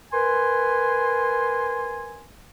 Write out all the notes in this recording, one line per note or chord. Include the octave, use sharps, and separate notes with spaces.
A#4 B4 G#5 C6